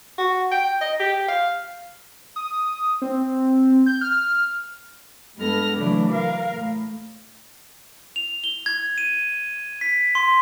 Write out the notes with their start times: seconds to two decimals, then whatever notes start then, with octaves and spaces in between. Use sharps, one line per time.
0.18 F#4
0.51 G5
0.81 D#5
0.99 G4
1.28 F5
2.36 D#6
3.02 C4
3.86 G6
4.01 F6
5.36 G2 G#3 B3 A4 F6 A#6
5.76 C#3 E3 F#3 A3 D4
6.11 A#4 F5
6.50 A2
8.16 F7
8.44 G7
8.66 G#6
8.98 D#7
9.81 B6
10.15 C6